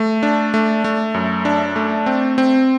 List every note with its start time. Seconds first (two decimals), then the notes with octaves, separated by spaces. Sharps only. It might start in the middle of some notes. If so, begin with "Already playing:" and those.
Already playing: A3
0.23 D4
0.54 A3
0.84 A3
1.14 F#2
1.45 D4
1.76 A3
2.06 C4
2.38 C4